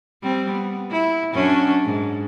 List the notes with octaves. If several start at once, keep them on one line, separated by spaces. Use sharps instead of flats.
G3 C4
B3
E4
F#2 C#4 D4
G#2